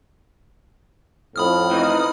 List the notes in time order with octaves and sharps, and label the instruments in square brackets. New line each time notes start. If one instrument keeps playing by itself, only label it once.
[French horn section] F2 A2 [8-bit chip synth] B5 D#6 F6
[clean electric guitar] E3 C4 D#4